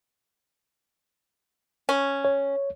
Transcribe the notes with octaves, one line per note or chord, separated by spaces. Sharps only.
C#4
C#5